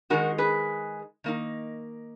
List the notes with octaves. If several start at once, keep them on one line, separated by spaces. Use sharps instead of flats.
D#3 G#3 D#4 F#4 A#4
G#4 B4
D#3 A#3 D#4